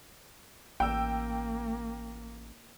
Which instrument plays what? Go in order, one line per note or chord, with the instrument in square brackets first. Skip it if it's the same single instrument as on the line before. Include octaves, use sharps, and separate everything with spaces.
[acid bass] A1 [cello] A#3 [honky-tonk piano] G5 E6